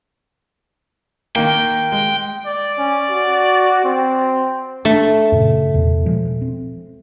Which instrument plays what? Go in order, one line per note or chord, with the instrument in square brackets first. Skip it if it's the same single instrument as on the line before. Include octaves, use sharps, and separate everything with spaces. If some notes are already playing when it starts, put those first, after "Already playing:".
[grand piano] D#3 A#3 [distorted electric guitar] G5
[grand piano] G#3
[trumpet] D5
[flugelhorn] C#4
F#4
C4
[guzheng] A3 [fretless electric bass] D4
[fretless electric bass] F#2 A#2 C#3
E2 C3
B2 F3 G#3
C4